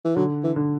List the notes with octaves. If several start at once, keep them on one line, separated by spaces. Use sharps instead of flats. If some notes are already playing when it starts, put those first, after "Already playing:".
E3
D3 F#3
E3
D3